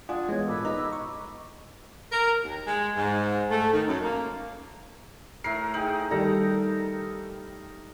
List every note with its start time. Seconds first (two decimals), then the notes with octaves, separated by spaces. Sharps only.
0.09 D4 F4 D5 F#5 G#5 D#6
0.29 E3 G#3 B3 C#5
0.47 A#2 A4 B4 D6 E6
0.65 D#4 D#5 A#5
0.93 C#6
2.12 A#4
2.44 D#2
2.67 G#3
2.97 G#2
3.50 A3
3.73 D#3
3.88 F#2
4.03 A#3
5.44 A2 A#4 C7
5.74 D#4 G#4 G5 F#7
6.11 D#3 G3 D#4 A4 A#5